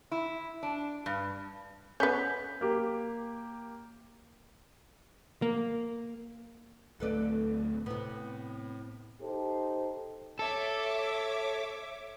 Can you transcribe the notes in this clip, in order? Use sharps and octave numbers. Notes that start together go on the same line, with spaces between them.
E4
D4
G2
B3 C#4 G6 B6
A#3 G4
A#3
D1 A3 C4 A4 B4 D5
A2 C3 B3
D#4 G4 A4 C5
A4 C#5 E5 D6